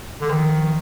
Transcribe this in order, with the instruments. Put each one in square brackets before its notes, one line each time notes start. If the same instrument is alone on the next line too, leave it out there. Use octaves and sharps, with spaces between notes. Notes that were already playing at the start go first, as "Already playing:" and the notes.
[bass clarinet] D3
[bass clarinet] D#3 [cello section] F3